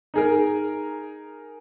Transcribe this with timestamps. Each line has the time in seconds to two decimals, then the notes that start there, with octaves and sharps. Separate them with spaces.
0.14 D#4 G#4 A#4